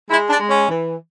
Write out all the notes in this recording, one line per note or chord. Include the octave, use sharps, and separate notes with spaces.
G#3 E4
D4
G#3
C#4
E3